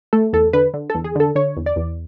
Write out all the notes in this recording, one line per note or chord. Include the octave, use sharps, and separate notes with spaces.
A3 A4
E2 A4
D3 B4
D3
A4
E2
G#4
D3 A4
D3 C#5
E2
D5
E2